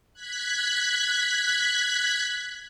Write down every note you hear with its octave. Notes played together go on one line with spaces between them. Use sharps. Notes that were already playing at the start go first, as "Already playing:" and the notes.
F#6 G#6 B6